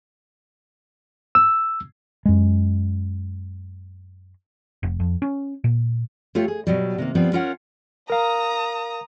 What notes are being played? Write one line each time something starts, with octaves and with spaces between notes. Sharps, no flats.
E6
F#2 G#3
F1
F2
C#4
A#2
A3 F4 G4 C#5
G#4
B2 F#3 G3
C3 D#3 A#3
F3 G3 B3 C4
C#4 F4 A#4 C#5 F#5
A#4 F5 A#5 D#6